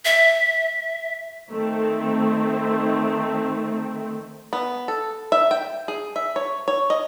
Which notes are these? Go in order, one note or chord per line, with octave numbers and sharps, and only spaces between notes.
E5
D#3 A3 C4
B3
A4
E5
G5
G#4
E5
C#5
C#5
D#5